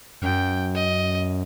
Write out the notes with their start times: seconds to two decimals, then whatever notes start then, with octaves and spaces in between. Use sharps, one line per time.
0.22 F#2 G5
0.75 D#5